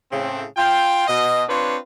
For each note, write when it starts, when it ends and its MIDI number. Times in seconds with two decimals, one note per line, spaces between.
0.12 0.44 45
0.12 0.44 49
0.12 0.44 60
0.57 1.05 65
0.57 1.05 79
1.08 1.44 47
1.08 1.44 75
1.48 1.77 60
1.48 1.77 62
1.48 1.77 65
1.48 1.77 71
1.48 1.77 73